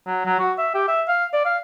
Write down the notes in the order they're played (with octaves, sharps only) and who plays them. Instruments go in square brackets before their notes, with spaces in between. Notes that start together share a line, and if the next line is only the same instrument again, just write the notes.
[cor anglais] F#3
F#3
F#4
E5
G4
E5
F5
D5
F5